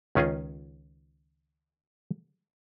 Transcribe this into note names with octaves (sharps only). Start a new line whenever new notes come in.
C#2 D#3 C#4 F4 G#4 D#5